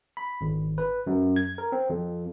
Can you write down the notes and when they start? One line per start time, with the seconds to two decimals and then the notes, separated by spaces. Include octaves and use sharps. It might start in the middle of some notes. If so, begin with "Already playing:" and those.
0.17 B5
0.41 G#1
0.78 B4
1.07 F#2
1.36 G#6
1.58 A#4
1.72 C4
1.90 F2